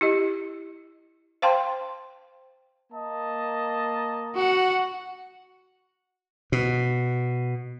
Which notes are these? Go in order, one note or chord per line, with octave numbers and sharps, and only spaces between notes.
E4 G4 D#5
C5 F5 G5 A5 C6
A#3 D#5 A5
F#4 F#5
B2